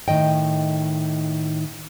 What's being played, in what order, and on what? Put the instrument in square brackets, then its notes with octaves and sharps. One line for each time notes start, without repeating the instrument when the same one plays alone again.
[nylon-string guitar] A2 D#3 D#5 G5